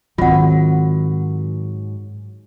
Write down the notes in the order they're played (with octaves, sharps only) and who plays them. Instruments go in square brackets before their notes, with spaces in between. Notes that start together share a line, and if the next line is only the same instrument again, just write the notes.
[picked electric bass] G#2 F#3 [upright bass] D#3 C4 [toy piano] F4 F#5